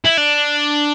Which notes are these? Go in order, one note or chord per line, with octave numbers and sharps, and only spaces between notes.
E4
D4